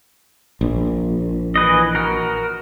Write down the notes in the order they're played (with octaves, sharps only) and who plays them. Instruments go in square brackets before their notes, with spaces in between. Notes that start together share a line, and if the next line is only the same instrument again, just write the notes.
[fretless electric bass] A#1
[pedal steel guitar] E3 B4 D#5
F#4 A#4